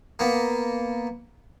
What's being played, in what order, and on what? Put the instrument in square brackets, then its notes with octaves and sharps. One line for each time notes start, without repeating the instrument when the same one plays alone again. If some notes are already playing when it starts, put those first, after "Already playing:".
[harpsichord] A#3 B3